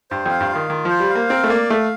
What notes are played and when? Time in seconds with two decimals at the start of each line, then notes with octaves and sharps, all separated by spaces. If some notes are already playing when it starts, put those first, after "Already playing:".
0.11 G2 C5
0.26 F2 F5
0.40 G2
0.50 F4
0.55 D#3
0.70 D#3 F4
0.85 F3 C5
1.00 G3
1.10 F5
1.15 A#3
1.29 C4 A#4
1.44 A3
1.50 A#3 D5
1.70 A3 F5